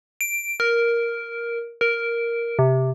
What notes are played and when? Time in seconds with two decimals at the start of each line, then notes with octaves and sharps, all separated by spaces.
0.21 D7
0.60 A#4
1.81 A#4
2.59 C3